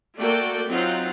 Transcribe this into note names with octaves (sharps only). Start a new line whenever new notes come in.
A3 A#3 F#4 A4 D5 G5
F#3 C4 D#4 F4 F5 F#5